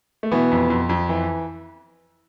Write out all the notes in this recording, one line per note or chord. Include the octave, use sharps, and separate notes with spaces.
A3
B2 E3 B3
F2
F2
F2
E3